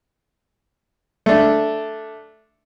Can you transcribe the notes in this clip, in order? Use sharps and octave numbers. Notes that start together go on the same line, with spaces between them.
A3 D4